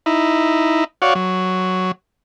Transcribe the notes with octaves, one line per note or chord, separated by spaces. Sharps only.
D#4 E4
F#4 C#5 D5 F5 F#5
F#3